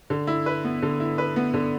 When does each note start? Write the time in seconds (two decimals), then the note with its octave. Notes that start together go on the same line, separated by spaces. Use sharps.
0.10 D3
0.27 E4
0.46 B4
0.64 B3
0.82 D3
1.00 E4
1.18 B4
1.36 B3
1.54 D3